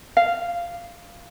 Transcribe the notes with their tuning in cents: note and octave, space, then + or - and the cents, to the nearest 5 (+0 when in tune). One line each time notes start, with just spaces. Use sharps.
F5 -10